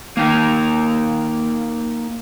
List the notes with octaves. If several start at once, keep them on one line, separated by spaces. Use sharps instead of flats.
A#3 D#4 A#4